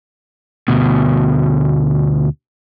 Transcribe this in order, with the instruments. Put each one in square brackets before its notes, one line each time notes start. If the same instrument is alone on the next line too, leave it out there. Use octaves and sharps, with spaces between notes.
[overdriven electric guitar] D2 B2